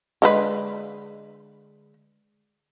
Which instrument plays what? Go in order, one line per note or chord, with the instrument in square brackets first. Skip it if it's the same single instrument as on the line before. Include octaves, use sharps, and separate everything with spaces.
[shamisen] D3 G#3 B4